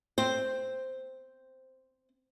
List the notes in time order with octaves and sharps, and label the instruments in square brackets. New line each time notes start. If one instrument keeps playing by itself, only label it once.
[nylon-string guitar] C4 C5